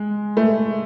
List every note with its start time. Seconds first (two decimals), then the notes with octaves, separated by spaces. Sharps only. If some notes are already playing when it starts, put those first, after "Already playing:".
Already playing: G#3
0.37 A3